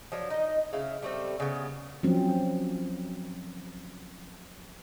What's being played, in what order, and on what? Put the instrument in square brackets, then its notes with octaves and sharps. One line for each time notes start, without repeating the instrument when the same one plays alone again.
[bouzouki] F3 F#3 D4
D#4 D#5
C#3 E4 F5
G3 A3 C4
C#3 B3
[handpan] F3 F#3 C4 C#4